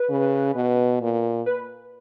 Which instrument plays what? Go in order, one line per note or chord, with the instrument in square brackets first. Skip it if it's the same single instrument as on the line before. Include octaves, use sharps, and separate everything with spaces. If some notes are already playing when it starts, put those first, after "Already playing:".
Already playing: [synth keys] B4
[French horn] C#3
B2
A#2
[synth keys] B4